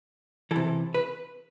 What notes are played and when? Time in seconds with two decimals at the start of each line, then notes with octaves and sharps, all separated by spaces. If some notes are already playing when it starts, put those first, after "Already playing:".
0.51 E3 A4
0.56 C3
0.94 B4